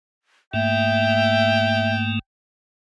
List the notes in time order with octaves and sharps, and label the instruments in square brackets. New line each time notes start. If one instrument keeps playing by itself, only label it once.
[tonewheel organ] G#2 A3 A#3 [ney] E5 [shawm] G5